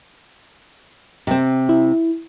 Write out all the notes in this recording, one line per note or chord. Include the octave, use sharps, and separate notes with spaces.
C3 C4
E4